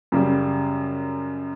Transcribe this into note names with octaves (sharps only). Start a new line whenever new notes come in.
F#2 C#3 G3